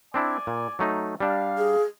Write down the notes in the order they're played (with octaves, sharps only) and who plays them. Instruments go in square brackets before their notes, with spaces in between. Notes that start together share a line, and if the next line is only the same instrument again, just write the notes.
[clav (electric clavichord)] C4 D4 E4 [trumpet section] D5 G#5
[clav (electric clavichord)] A#2
F#3 A3 D#4
[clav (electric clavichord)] G3 D4 [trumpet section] F5
[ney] G#4